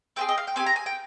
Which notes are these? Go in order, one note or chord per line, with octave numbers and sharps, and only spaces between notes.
C4 F4 G#4 G5
D#5
F5
G5
C4 G4 G#5
A#5
G#5
G5